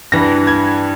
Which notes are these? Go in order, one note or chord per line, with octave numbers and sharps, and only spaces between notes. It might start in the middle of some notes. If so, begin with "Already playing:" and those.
G2 E3 A#6
G#6